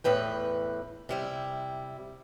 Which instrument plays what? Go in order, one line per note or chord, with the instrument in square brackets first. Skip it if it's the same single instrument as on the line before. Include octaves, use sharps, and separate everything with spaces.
[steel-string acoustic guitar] E2 A2 B4 G5
C3 G3 E4